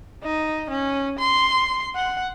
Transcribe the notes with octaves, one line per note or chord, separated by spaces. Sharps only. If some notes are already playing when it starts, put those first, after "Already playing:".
D#4
C#4
C6
F#5